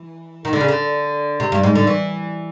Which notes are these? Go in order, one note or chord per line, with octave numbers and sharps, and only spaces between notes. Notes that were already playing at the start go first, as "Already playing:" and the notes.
Already playing: E3
D#3
D3
C#3
D3
C3
G2
G#2
D3
E3